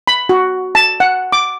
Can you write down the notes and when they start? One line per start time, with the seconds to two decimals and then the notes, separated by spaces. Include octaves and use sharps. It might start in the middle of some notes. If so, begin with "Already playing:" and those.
0.07 B5
0.29 F#4
0.75 A5
1.00 F#5
1.32 D6